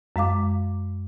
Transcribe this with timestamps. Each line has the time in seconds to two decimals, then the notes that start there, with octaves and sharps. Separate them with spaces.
0.16 F#2 G#3 F5 D6